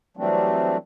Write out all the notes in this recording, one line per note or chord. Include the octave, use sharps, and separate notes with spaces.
E3 F#3 G3 A3 C4 D4